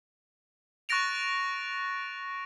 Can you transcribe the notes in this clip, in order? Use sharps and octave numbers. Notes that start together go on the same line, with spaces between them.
C#6 F#6 A6 A#6 D7 F7